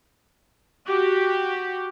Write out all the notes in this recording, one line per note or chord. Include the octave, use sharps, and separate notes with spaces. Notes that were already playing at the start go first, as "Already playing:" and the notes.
F#4 G4